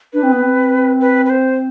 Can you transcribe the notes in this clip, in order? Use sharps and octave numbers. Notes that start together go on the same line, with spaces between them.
D4 B4
C4
B3
C4
B4
B4
C5